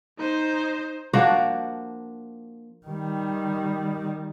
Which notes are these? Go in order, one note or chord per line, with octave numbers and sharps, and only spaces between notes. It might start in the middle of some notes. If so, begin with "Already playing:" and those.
D#4 C5
F3 A#3 D4 F#4
D#3 G3